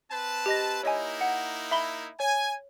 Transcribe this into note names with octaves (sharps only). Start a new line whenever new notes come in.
C4 B4 A5
G4 D#5 A#6
A#3 D#4 E4 C#5 D#5 G#5
F#5
E5 B5 G7
C#5 G#5